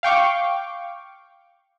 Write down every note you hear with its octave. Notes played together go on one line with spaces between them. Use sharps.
F5 G5 C#6 D6